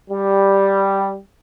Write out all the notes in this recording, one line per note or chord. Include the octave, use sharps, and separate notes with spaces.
G3